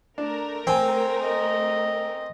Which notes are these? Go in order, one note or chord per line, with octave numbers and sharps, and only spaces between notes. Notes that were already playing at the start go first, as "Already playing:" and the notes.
A3 D4 A#4
C4 G5 G#5
D#5